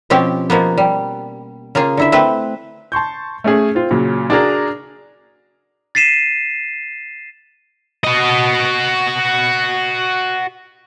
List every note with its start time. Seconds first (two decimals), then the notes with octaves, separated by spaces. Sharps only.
0.10 B2 F3 C4 C#4 G4
0.50 B2 F3 A#3 B3
0.78 G3
1.75 C#3 A#3 F4 G#4
1.97 D3 E4 E5
2.12 A3 C4 B4
2.92 A5 C6 C#6 G6
3.44 A3 C#4 G#4
3.75 C4 F4
3.91 A#2 C#3 F#3
4.30 D4 F#4 G#4 A#4
5.95 A6 B6 C7 D#7 E7
8.04 F#4 D#5